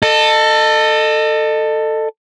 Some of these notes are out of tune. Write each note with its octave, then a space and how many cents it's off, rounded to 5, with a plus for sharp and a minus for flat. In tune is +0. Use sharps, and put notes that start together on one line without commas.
A4 +15 D#5 -30